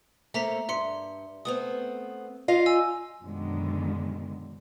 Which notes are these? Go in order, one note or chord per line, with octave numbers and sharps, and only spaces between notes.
A3 A#3 C4 E5 A#5 B6
G2 E5 C6 C#7
A3 B3 C4 D#6
F4 D#5 F5
G#5 E6
F#2 B2 D3 D#3 G#3